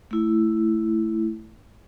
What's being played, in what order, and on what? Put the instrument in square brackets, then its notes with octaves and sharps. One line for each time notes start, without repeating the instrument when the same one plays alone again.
[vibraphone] A3 E4